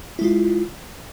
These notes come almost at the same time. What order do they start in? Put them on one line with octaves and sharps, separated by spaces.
E4 G#3 F4